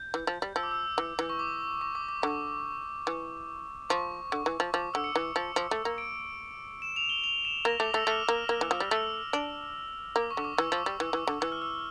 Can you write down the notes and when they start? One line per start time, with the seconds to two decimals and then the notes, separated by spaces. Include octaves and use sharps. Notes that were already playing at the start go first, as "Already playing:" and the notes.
Already playing: G6
0.14 E3
0.27 F3
0.42 G3
0.56 F3 E6
0.63 D6
0.71 E6
0.98 E3
1.19 E3
1.29 C#6
1.39 D6
1.81 C#6
1.95 D6
2.09 D6
2.22 D3 C#6
3.07 E3
3.90 F3 C#6
4.32 D3
4.46 E3
4.60 F3
4.73 F3 D6
4.94 D3 E6
5.04 C#7
5.16 E3
5.36 F3
5.56 F3
5.71 A3
5.85 A#3
5.98 D7
6.82 E7
6.96 F7
7.09 G7
7.24 F7
7.45 E7
7.65 A#3 A#6
7.80 A3 D6
7.94 A3 E6
8.07 A3 F6
8.28 A#3
8.49 A#3
8.61 E3
8.71 F3
8.80 G3
8.91 A3 E6
9.33 D4
10.16 A#3 D6
10.31 C#6
10.37 D3
10.45 D6
10.58 E3 E6
10.72 F3
10.78 D6
10.86 G3
11.00 E3 E6
11.13 E3
11.27 D3
11.41 E3 E6
11.52 F6
11.62 E6